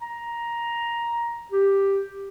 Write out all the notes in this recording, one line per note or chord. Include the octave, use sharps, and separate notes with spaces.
A#5
G4